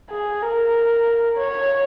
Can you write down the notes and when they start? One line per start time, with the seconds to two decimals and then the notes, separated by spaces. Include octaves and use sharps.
0.10 G#4
0.42 A#4
1.38 C#5